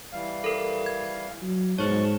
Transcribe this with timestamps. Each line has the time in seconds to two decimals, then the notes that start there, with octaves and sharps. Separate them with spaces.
0.13 E3 G3 F5
0.44 A4 A#4
0.86 G#6
1.42 F#3
1.78 G#2 B2 C5 C#5 A5 C#6